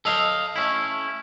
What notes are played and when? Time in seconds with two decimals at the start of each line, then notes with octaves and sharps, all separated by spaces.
0.05 A4 D#5 F5
0.56 A3 C#4 E4